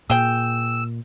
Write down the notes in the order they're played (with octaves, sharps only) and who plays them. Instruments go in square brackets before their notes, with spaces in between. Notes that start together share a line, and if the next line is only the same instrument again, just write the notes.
[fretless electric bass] A#2 [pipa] G#4 G5 [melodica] E6